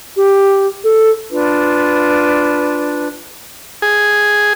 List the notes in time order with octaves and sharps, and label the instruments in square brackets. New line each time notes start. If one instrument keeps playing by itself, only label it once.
[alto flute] G4
A4
[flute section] D4 F4 B4
[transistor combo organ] G#4